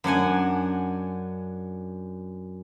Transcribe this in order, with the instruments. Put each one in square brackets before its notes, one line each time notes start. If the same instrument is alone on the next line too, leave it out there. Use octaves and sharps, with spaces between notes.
[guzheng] F#2 D4 F#5 G#5